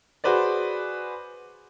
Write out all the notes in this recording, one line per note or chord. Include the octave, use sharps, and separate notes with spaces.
F#4 G#4 B4 C5 D5